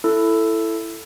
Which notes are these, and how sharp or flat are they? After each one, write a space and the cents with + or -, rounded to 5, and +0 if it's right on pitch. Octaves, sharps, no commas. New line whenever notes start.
E4 +10 A4 +5